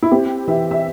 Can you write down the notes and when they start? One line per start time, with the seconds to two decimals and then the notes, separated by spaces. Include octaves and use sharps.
0.02 E4
0.11 C4 G4
0.48 E3 E5
0.71 E5